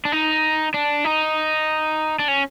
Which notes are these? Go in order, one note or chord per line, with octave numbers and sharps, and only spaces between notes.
D4
D#4
D4
D#4
D4
C#4